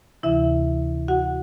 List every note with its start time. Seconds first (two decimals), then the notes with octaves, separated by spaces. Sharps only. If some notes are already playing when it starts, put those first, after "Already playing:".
0.23 D2 C3 E3 E4 E5
1.08 F#4 F#5